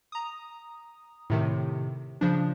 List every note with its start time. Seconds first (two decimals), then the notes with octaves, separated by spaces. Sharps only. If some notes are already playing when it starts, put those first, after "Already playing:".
0.12 A#5 D#6
1.30 A2 C3 D#3
2.21 C#3 F3 D4